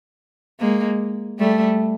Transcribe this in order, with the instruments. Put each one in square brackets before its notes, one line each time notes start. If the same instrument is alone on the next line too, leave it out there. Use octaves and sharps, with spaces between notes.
[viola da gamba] G#3 A#3
G3 A3